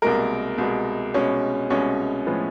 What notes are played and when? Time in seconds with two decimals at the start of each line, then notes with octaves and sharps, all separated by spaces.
0.02 C2 B2 G#3 A#3 A#4
0.58 C2 B2 G#3
1.14 C2 B2 G#3 C#4 C#5
1.70 C2 B2 G#3 C#4 C#5
2.27 A2 F3 G#3 B3